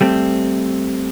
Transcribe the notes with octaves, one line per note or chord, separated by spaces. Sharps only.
G3 A3 C4